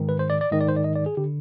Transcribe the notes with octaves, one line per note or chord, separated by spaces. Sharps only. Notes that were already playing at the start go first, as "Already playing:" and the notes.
Already playing: G#2 D#3
B4
C5
D5
D5
G#2 D#3 D#5
D5
C5
D5
D#5
D5
G#4
D3 G4